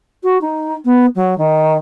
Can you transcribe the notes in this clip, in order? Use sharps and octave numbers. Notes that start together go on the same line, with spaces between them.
F#4
D#4
B3
F#3
D#3